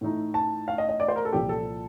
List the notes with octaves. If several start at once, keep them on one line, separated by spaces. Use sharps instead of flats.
A2 A3 D#4
A5
F5
D#5
D#5
D5
C5
A#4
A4
C2 A#2 F3 G4
A4